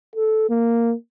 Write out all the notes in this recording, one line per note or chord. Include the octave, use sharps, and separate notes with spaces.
A4
A#3